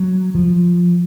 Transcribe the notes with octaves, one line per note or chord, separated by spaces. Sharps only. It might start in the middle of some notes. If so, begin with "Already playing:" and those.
Already playing: F#3
F3